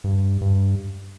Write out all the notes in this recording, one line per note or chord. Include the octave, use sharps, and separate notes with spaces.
G2
G2